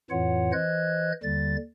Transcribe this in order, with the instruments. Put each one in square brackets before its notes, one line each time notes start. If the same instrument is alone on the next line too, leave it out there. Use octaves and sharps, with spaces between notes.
[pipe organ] F2 A2 E3 F4 C#5 F#5
E3 C5 D#5 F#6 G#6
D#2 D3 G3 A6